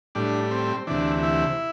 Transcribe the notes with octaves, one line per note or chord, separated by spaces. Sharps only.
A2 G3 D4
C4
D2 C3 E3 D4
E4